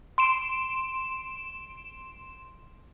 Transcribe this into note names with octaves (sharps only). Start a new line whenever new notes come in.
C6 D7 E7